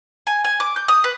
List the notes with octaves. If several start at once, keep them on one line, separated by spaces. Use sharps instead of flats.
G#5
G#5
D6
G6
D#6
B4